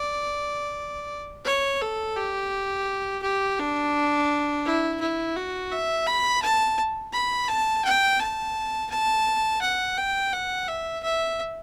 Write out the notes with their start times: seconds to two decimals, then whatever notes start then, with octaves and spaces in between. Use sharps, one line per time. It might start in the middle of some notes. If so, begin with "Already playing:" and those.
Already playing: D5
1.45 C#5
1.81 A4
2.16 G4
3.23 G4
3.59 D4
4.65 E4
5.01 E4
5.36 F#4
5.71 E5
6.06 B5
6.42 A5
7.13 B5
7.49 A5
7.85 G5
8.20 A5
8.90 A5
9.61 F#5
9.98 G5
10.33 F#5
10.68 E5
11.04 E5